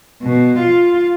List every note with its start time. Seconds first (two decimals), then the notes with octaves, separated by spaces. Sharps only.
0.22 B2
0.59 F4